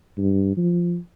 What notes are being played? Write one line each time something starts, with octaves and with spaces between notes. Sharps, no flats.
G2
F3